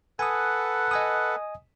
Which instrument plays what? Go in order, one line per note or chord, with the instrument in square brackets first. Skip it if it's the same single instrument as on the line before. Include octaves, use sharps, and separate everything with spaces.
[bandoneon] A4 B4 F#5 [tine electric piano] G#5 D#6
[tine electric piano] D#5 G#5 D#6